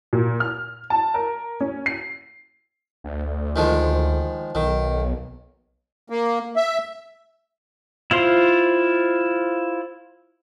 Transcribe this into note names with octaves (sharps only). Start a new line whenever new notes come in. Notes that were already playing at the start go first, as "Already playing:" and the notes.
A#2
F6
A5
A#4
C#4
C7
D2
D#3 F3 G#3
B1 D#3
A#3
E5
E4 F4 C5 C6